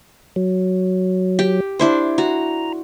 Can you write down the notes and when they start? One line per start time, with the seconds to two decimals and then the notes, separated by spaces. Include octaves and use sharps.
0.36 F#3
1.39 G4
1.79 D4 E4 C5
2.18 F#4 A#5